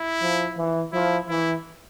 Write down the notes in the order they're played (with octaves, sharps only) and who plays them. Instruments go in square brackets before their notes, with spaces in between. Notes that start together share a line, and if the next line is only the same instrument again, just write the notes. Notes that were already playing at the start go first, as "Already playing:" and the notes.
Already playing: [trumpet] E4
[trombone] F3
E3
[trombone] F3 [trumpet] E4
[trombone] E3 [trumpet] E4